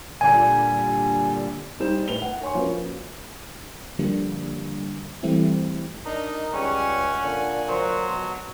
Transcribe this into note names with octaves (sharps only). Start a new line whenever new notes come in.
A#2 D3 G3 G#5
G3 D#4 C5 G6 E7
A2 B4 F7 G7
F#5
C#5 G#5 C6 C#6
F3 A#3 C#4 F#4 A#4 B4
D3 F3 G3 A#3 D4
E3 G3 A3 C4 E4
D4 D#4 A#4 D#5
C#2 G3 C#4 F#5 G#5
A#2 D3
F#3 A#4 C5 C6
B2